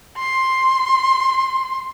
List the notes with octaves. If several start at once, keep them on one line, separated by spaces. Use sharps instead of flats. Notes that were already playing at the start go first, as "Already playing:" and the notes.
C6